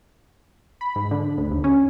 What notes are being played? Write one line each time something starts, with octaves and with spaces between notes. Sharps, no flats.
B5
G#2
D3
D2
D#2
C#4